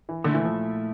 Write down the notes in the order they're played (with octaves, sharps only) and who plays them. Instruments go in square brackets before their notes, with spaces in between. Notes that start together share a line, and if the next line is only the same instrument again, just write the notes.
[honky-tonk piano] E3
[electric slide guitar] A#2 A3 E4 [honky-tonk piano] D3
[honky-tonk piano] E3
F3